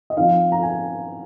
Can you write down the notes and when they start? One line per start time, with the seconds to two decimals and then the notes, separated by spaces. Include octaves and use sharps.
0.10 D#5
0.17 F3 C4 D#4 F5
0.52 A#5
0.63 G#5